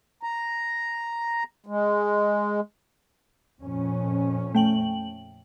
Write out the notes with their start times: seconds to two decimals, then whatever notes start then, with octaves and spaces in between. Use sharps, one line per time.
0.23 A#5
1.66 G#3
3.60 F2 A#2 C#4
4.54 A3 G5 F#7